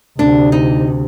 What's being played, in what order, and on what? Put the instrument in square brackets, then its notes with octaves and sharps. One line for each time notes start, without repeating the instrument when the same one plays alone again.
[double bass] D2 C3 [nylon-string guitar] D4
[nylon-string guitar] D#4